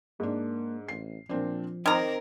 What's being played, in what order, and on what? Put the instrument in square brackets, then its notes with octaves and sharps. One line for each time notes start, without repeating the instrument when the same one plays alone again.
[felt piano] G#2 D4 [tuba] A#3
[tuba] A1 [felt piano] C7
[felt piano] A#2 C4 D4 [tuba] F3
[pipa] D#3 A#5 [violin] C4 A#4 [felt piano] D6 F6 G#6